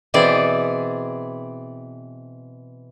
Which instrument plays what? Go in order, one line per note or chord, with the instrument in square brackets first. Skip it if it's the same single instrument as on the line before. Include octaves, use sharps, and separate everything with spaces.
[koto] B2 E3 C4 G#4 D5